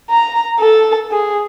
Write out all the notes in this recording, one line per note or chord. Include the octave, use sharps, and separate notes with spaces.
A#5
A4
G#4